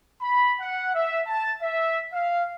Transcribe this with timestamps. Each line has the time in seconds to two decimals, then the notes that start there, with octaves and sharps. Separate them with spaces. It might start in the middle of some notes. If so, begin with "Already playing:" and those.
0.22 B5
0.60 F#5
0.95 E5
1.27 A5
1.62 E5
2.14 F5